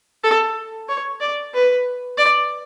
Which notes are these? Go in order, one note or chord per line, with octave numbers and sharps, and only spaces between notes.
A4
C#5
D5
B4
D5